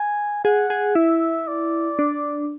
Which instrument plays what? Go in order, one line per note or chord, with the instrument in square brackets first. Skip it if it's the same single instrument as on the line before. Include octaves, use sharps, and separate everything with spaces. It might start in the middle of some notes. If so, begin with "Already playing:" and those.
Already playing: [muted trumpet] G#5
[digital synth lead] G#4 [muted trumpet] F#5
[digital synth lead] G#4
[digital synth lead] E4 [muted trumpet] E5
[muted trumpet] D5
[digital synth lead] D4